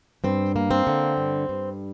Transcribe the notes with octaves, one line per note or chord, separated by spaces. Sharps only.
G2 C4
A#3
C4
D3
G2
G2